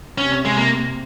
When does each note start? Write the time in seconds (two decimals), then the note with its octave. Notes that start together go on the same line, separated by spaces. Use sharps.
0.18 C3 C#4
0.45 G#3
0.57 A#3